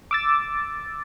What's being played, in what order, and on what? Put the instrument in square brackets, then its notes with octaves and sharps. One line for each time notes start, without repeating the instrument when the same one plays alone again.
[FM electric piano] D6 E6 A6